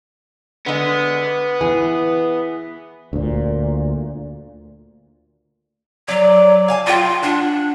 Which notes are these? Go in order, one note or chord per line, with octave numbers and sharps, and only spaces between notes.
D3 G#3 B3
E3 G#4
D2 A#2
F#3 D5
F5 G#5 A5
F4 F5 G5
D4 F#5